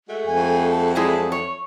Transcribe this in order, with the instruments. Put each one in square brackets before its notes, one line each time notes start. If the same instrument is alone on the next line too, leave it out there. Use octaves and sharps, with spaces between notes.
[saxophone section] G#3 A3 F#4
[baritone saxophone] F2 [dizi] G#5
[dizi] A5
[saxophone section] F#3 A3 D5 [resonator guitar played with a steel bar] G#3 E4 G#4
[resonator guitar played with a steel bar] C#5